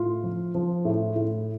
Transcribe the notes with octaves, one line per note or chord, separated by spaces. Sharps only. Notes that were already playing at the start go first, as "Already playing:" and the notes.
Already playing: A2 F4
F3
F3
A2
A2